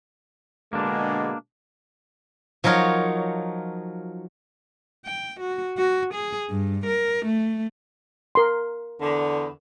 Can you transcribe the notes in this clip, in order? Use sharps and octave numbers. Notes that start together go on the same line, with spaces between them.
B2 D3 G#3 A#3 D4
F3 F#3 D#4 A#4 C#5
G5
F#4
F#4
G#4
G2
A#4
A3
A#4 C6
E2 D3